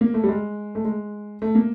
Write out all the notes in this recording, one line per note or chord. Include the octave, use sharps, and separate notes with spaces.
A#3
A3
G3
G#3
A3
G#3
A3
A#3